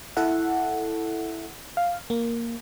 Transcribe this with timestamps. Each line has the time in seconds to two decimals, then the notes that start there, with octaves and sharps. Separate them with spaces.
0.17 E4 A4 E5 F#5
1.77 F5
2.10 A#3